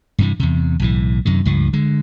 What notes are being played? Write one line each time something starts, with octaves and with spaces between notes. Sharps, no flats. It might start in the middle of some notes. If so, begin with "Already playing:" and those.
G2 C3 E3
E2 C3
B1 A2 E3
F#2 C3 D#3
C#2 G2 F3
D3 G#3